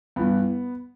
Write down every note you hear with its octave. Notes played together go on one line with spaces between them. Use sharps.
G2 E3 B3